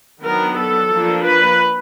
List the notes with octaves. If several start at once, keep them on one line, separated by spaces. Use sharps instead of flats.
D#3 F#3 B3 D4 A#4
A4
F3 A#3 D4
B4